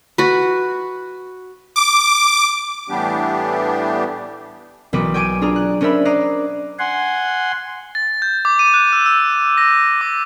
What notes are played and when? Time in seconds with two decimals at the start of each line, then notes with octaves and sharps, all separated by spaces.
0.18 F#4 B4
1.76 D6
2.90 A2 E3 G3 B3 D4 G4
4.93 B1 E3 A#3 B4 D6
5.14 G5 G#5 C#6 D6 D7 D#7
5.41 D4 F4 G#4 A#5
5.56 F#6
5.81 C#4 D4 A#4 C5 E5 B5
6.05 D#5 A#5 D6 F#6 C7
6.79 F#5 G#5 C6
7.95 A6
8.22 G6
8.45 D6
8.59 D#7
8.74 F#6
8.92 E6
9.06 E6
9.58 A#6
10.01 D6